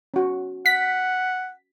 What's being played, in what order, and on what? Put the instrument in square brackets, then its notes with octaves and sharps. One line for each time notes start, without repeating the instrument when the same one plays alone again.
[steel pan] C#4 F#4
[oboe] F#5 [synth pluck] B6